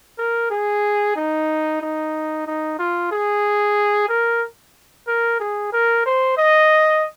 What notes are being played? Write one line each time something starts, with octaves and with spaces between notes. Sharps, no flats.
A#4
G#4
D#4
D#4
D#4
F4
G#4
A#4
A#4
G#4
A#4
C5
D#5